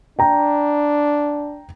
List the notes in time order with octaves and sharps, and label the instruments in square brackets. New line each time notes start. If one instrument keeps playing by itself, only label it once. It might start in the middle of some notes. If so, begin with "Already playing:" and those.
[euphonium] D4 [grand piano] G5 A#5